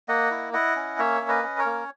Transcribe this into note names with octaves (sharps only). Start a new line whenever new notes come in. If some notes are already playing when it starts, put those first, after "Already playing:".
A#3 D#5 F#5
E4
E4 D#5 F#5
C#4
A#3 C#5 E5
C#4
B4 D#5
C#4
A#4 C#5
A#3